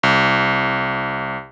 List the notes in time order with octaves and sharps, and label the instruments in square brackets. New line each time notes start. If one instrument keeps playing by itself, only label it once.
[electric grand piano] C2